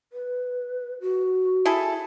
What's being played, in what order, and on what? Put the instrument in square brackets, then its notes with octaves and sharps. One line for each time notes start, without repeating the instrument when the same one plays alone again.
[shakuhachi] B4
F#4
[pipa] E4 G#4 A4